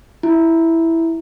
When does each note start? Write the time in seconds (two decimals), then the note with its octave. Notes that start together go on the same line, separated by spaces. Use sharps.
0.23 E4